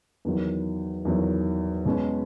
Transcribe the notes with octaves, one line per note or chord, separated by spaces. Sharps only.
E2 D#3 F#3
E2 D#3 F#3
B2 G#3 C#4